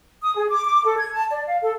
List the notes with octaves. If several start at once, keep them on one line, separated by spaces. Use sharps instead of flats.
D#6
G#4
D6
D6
A4
G#6
A5
D5
F5
A4